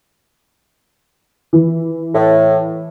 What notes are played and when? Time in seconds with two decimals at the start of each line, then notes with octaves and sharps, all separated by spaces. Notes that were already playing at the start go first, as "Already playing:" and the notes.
1.53 E3
2.15 A2